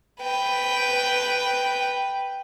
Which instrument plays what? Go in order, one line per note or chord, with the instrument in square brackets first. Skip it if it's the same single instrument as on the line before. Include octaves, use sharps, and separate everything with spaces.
[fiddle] B4 G5